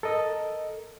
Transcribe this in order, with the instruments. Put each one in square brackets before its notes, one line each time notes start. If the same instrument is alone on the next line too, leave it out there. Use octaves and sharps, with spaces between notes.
[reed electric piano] A4 A#4 D#5